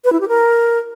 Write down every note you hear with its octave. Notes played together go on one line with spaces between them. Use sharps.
B4
E4
G4
A#4